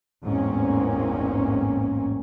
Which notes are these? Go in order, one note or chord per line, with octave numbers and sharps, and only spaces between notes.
A1 E2 G#2 A#3 C4 C#4